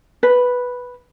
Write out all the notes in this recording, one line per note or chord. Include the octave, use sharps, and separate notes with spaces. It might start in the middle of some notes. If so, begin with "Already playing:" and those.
B4